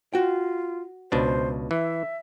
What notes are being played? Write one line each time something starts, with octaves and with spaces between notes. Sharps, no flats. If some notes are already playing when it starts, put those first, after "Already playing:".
F4 F#4 G5
C#2 B2 D4 C5
E3 E5